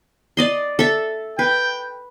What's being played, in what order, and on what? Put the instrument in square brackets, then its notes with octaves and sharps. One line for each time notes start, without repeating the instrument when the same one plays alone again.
[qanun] D5 D#5 C6
A4 E5
[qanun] B4 [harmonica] G5